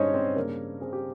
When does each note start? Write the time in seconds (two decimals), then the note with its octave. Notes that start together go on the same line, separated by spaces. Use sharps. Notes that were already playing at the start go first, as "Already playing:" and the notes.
Already playing: G2 G#3 C#4 D#4 C5 C#5 D#5
0.14 C4 C5
0.36 C#3 A#3 A#4
0.81 C4 G#4
0.93 G4